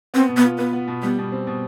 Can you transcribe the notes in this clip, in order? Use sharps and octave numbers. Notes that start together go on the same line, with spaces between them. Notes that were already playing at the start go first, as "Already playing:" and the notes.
B3 C4
B2
B3
F4
B3 B4
B3
B2
G3 B3
B2
C4
B2